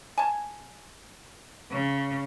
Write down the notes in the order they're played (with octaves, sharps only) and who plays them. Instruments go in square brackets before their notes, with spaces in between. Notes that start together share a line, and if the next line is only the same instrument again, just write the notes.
[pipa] G#5 A5
[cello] C#3